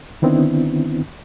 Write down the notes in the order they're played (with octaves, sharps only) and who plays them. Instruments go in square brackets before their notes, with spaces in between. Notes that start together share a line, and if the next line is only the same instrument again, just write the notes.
[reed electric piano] D3 D#3 B3 C4 D4 E4